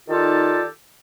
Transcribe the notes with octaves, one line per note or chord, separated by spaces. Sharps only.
D#3 D#4 F4 G4 A4 D5